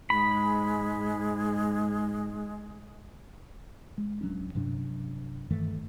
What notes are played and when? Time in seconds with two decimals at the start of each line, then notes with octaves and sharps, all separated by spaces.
0.10 G#2 G#3 B5
3.98 G#3
4.21 D1 F#3 C#4 D4
4.55 G2 C3 F#3 D4
5.50 G2 D#3 E3 A3